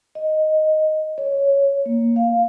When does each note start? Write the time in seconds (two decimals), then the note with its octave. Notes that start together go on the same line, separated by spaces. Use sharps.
0.15 D#5
1.18 C#5
1.86 A#3
2.16 F5